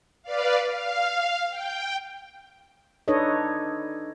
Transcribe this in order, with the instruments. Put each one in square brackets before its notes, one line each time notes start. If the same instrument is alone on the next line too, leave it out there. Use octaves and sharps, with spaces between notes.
[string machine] B4 D5 F5
F5
G5
[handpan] D4 D#4 A4 B4 C#5 D#5